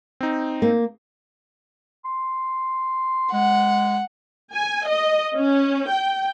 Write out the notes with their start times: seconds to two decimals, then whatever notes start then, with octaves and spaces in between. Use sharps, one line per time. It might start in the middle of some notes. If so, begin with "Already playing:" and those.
0.21 C4 D#4
0.62 A#3
2.05 C6
3.32 G#3 F#5
4.53 G#5
4.88 D#5
5.36 C#4
5.90 G5